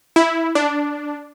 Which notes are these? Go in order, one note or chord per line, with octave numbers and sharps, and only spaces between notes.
E4
D4